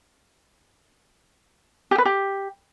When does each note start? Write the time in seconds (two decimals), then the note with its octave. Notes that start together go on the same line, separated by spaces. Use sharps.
1.91 G4
1.98 B4
2.05 G4